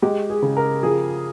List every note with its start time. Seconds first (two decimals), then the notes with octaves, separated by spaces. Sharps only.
0.02 G#3 G4
0.30 G#4
0.42 C#3
0.57 A#4
0.83 F3 G#4